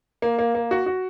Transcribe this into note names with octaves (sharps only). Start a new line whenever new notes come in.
A#3
A#3
A#3
F#4
F#4